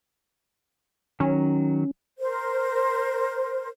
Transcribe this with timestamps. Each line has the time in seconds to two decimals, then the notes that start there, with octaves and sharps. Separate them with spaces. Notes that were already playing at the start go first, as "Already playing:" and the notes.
1.20 D#3 F#3 C#4
2.19 A#4 C5